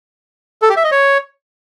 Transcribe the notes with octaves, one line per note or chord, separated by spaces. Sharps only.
A4
G4
E5
D#5
C#5